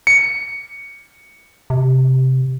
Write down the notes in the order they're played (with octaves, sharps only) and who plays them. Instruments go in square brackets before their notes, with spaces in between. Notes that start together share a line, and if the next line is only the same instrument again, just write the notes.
[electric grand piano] C#7
[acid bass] C3